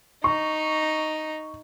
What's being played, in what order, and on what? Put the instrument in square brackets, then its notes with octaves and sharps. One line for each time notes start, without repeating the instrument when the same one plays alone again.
[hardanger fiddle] D#4 [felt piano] C#6